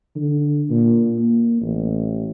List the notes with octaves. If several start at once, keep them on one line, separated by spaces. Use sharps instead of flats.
D3
A#2
A#3
A1